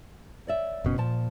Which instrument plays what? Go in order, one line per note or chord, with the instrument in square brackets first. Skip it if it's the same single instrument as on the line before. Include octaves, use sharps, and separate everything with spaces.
[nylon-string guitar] C#5 D5 E5
[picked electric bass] F#1 B2 C#4
[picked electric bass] A#2 [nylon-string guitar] F3 A5